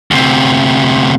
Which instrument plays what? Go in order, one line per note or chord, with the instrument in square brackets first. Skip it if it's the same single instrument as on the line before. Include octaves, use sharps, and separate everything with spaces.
[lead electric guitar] D2 C3